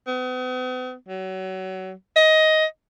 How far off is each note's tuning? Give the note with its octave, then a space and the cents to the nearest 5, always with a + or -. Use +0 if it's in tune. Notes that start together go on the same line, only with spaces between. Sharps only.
B3 +45
F#3 +30
D#5 +15